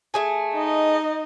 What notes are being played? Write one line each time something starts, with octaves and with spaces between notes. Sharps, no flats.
A3 G#4 G#5
D#4 D#5